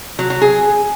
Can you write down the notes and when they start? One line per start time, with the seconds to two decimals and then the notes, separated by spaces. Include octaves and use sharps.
0.19 F#3
0.30 F#3
0.42 G#4